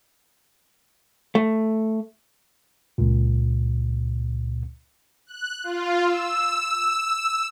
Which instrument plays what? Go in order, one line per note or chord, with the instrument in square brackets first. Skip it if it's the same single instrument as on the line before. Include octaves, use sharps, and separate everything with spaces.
[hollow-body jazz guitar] A3
[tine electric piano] C#2 A#2
[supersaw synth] F#6
F4
E6